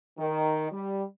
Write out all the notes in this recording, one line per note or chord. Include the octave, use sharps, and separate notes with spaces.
D#3
G3